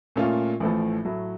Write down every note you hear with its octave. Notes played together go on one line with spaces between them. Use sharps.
A#2 A3 C#4 F4
A1 A2 F3 A3
A2 F#3 A3